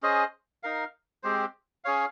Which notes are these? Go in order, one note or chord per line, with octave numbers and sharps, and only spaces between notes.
C#4 G#4 C5 D#5
D#4 A#4 F5
G#3 C4 G4 C5
C#4 G#4 C#5 F5